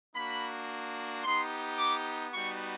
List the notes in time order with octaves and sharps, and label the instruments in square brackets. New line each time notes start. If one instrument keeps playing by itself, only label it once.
[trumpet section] A#3 D4 F#4 B5
B3 D#4 G4 C6
D6
G3 B3 D#4 F#4 C#6